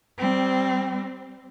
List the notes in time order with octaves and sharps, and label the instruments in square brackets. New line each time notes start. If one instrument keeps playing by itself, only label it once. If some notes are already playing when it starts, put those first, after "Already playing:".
[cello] G3 C4